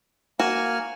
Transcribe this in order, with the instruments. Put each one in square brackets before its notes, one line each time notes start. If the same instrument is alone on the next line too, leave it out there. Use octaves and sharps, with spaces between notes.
[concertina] A#3 G#5 F6 [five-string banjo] F#4